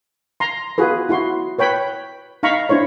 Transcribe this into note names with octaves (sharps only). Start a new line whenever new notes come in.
A#5 C6
F4 F#4 G#4 B4
E4 F#4 C6
B4 C#5 G5 B5
D#4 F5 A#5 B5 C#6
D4 E4 C5 C#5